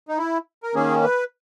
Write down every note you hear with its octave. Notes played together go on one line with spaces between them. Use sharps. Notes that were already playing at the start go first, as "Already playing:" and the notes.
D#4
E4
A#4
D#3 A#3 C#4 G#4
B4